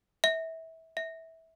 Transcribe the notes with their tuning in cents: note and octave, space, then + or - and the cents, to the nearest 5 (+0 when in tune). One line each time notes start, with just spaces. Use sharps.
E5 -25
E5 -20